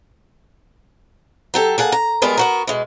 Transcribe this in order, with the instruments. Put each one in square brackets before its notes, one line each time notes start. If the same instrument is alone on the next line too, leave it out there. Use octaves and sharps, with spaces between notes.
[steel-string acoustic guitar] F#3 G4 A4
A#3 G#4 F#5 A5
A#5
G3 G#3 B3 A#4
B3 F#4 A#4
B2 G#3